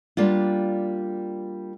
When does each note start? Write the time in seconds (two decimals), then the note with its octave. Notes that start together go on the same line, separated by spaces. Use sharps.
0.17 G3 A#3 D4 F4